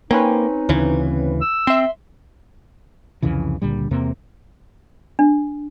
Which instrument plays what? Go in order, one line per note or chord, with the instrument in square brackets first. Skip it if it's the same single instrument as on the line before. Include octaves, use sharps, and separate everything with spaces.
[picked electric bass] A#3 [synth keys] C4 C#4 B4 [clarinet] D#4
[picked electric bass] D2 C#3 E3
[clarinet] E6
[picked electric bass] C4 [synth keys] E5 C6
[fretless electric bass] C2 F2 C#3 E3
C#2 A#2 D3 G3
E2 C3 A#3 C4
[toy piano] D4